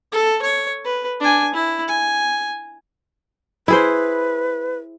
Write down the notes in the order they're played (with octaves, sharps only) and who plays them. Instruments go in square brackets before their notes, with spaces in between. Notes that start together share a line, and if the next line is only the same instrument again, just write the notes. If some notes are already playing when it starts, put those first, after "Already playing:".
[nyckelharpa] A4
C#5
B4
D4 G#5
E4
G#5
[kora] E4 G#4 C5 [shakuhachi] B4